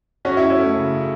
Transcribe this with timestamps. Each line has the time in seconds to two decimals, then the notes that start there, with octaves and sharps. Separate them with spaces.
0.25 F#2 C#4 F#4
0.37 E4
0.41 F#2
0.50 C#4
0.58 A3
0.75 C#3